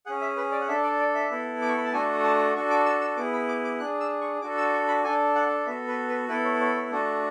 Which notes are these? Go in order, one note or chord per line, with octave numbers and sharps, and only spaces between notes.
C#4 G#4 F#5
E5
B4
D5
F#5
D4 A4 E5
D5
D5
E5
B3 E4 A4
D6
C#6
B5
A5
A3 D4 F#4 A4 G#5
A5
D4 F#4 A4 C#6
D6
E6
E6
B3 E4 G#4 D6
B5
D6
D6
D4 G#4 F#6
E6
C#6
D4 F#4 A4 D6
E6
C#6
B5
D4 A4 G#5
F#5
B3 F#4 A4 E5
B4
B4
B3 E4 A4 B4
C#5
C#5
C#5
A3 D4 F#4 A4